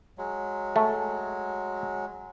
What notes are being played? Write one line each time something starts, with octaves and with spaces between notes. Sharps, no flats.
F#3 G#3
A3